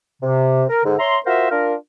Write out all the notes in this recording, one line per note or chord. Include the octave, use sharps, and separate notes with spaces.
C3
A#4
G#2 D3
C#5 E5 A#5 C6
F4 F#4 A#4 C5 E5
D4 F4 A#4